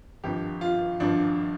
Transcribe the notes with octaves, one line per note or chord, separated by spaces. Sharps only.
G#1 G2 F3 G4
F4
G#1 G2 F3 D4